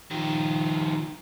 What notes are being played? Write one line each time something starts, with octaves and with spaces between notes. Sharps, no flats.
D#3 F3